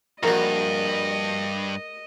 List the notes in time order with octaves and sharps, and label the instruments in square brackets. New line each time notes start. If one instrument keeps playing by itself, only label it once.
[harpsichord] A#1 F#4 [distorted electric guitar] G2 [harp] A#4 [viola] D#5